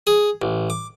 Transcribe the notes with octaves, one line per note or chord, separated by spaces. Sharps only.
G#4
A1
D6